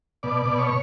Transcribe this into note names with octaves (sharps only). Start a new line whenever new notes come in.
B2 D5
B2
C#5